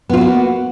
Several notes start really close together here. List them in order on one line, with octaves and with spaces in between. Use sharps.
B3 F4 F#4 A#3